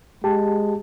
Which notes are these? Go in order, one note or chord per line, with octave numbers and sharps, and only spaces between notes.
G#3 G4 A5